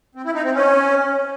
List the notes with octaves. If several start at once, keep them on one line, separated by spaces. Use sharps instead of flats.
C4
E4
D#4
C4
C#4